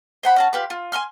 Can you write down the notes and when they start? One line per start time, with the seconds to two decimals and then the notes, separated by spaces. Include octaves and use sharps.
0.23 C5 F#5 B5
0.36 C#4 F#4 A5
0.53 F4 G4 B4
0.70 F4
0.92 G#5 A#5 C6 F6